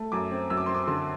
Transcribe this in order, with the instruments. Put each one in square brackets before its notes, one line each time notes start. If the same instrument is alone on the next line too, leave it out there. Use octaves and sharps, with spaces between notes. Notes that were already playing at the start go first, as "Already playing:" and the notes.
Already playing: [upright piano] A3
F#2 D6
C4
F#2 E6
D6
C4 C6
D6
D3 C6